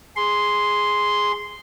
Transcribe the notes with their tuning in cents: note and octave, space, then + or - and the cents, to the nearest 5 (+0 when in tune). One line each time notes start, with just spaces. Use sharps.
G#4 +0 C6 -5